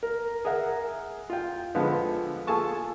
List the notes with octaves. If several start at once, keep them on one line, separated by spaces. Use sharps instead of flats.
A#4
G#4 A#4 E5 F#5
F4 G5
D3 F3 G#3 B3
F4 G#4 A4 G#5 A5 C#6